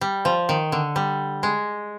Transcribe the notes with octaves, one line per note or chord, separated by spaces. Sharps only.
G3
F3
D#3
D3
G3
G#3